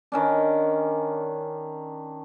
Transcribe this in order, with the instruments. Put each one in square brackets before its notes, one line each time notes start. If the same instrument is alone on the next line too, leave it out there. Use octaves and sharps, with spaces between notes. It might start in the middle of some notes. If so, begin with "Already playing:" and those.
[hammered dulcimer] D#3 C#4 D4